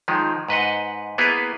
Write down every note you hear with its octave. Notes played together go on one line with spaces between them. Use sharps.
D#3 F3 G#3
G#2 B4 D#5 F#5
A#3 B3 E4 G#4 B4